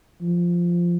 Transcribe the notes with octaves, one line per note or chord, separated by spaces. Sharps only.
F3